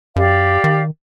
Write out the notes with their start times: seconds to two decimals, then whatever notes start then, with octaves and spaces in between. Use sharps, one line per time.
0.16 F#2 G4 D5 F5
0.64 D#3